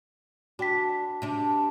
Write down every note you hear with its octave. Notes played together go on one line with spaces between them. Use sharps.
D4 F#4 G5 B6
C3 D4